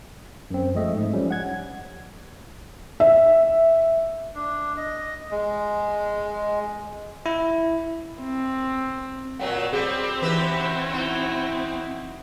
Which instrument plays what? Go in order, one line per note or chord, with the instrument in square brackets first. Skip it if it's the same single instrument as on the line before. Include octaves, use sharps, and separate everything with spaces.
[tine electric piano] F#2 C4
F3 G#3 A3 D#5 E5
G#2
F3 G3 C#4
F#5 G#6
[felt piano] E5
[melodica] D4
D#5
G#3
[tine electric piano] E4
[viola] C4
[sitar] A#2 F#3 A3 [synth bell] F#5 G5
[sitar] G3 [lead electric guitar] C4 [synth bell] G#4
[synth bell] E3 E7 [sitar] D#4 G4 B4 [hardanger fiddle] E4 F#4
[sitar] D#4